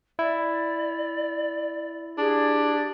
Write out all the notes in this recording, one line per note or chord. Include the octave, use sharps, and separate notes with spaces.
E4 D5
D4 G4 G#4